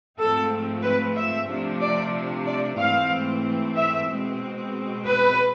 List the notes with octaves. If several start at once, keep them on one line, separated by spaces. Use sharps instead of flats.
G#2 F3 A3 C4 A4
B4
E5
C3 F3 A3 D4
D5
D5
G#2 E3 A3 C4 F5
E5
B2 G#3 C4
B4